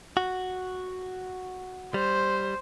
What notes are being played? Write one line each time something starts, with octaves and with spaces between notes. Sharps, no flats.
F#4
G3 C5